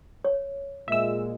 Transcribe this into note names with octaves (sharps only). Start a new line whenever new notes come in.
C#5
A#2 G#3 E5 E6